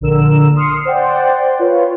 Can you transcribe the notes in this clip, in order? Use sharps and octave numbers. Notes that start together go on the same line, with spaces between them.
A#1 D3 A#4 E6 E7
C6 D#6 F6 C7 C#7
C5 D5 F#5 G5
F4 B4 C#5